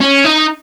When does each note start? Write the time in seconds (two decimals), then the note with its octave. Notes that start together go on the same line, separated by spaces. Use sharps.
0.01 C#4
0.25 D#4